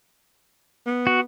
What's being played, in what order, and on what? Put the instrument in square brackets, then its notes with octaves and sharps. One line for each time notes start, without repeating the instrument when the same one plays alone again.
[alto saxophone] B3
[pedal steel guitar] F#4